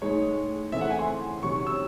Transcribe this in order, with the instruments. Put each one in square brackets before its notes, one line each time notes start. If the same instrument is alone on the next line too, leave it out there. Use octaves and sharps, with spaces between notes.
[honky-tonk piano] A2 G#3 D#4 G#4 [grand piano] C#5
[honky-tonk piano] C#3 E3 A3 C4 [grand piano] E5
[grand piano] F#5
G#5
C6
[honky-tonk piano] C3 D#3 F#3 C#4 F#4 [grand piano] C#6
[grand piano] E6